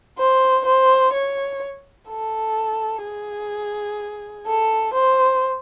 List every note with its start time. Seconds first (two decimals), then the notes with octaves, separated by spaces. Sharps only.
0.19 C5
0.66 C5
1.13 C#5
2.09 A4
3.04 G#4
4.47 A4
4.93 C5